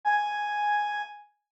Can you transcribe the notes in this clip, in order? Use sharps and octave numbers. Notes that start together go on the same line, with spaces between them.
G#5